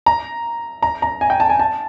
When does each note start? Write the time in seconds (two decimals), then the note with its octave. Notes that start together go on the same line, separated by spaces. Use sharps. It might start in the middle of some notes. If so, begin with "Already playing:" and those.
0.06 A#5
0.83 A#5
1.02 A#5
1.21 G#5
1.30 G5
1.40 A5
1.50 G#5
1.59 A5